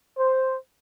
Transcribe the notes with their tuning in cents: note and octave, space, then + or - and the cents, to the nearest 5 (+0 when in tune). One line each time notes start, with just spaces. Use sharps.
C5 +0